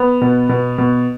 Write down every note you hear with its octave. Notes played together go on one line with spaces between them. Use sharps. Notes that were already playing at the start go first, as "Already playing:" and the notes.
Already playing: B3
B2
B2
B2